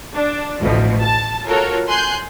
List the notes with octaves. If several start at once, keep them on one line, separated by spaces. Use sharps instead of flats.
D4
A1 D2 B2 F3
A5
F4 F#4 A4 A#4 C#5
G#5 C6 F#6 G6